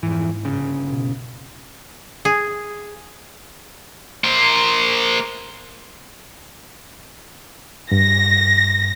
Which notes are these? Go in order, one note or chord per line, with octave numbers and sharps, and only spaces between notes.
F2 G#2 E3
G1 C#3
B2
G#4
A#3 C5
G2 A#6